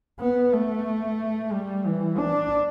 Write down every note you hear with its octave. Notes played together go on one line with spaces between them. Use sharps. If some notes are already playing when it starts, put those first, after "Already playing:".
B3
A3
G3
E3
D4